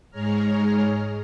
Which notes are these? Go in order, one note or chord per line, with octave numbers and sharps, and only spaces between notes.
G#2 G#3 G#4 C#5 A#5 F6